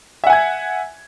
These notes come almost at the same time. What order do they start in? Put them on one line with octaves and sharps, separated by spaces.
E5 F#5 G#5 G#6